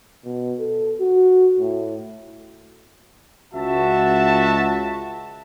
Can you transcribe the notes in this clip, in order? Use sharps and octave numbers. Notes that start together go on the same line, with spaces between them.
B2
A4
F#4
A2
C#2 F#4 E5 A5